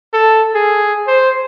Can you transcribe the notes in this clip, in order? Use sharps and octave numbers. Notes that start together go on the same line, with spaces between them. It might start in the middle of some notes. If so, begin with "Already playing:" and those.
A4
G#4
C5